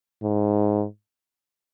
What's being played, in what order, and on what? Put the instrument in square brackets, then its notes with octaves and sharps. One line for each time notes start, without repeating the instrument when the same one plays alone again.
[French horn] G#2